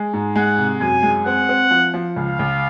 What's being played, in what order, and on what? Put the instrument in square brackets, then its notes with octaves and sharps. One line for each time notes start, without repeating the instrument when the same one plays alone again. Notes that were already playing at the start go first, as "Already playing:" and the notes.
Already playing: [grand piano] G#3
G#2
[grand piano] G#3 [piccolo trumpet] F#5
[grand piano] C3
[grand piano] F#2 [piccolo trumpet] G#5
[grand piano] G#3
[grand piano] C4 [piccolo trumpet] F#5
[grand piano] C4
F3
F3
[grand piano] C#2 [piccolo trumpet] F5
[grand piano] C#2